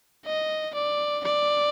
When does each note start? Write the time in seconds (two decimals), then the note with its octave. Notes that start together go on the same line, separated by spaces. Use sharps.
0.26 D#5
0.74 D5
1.24 D5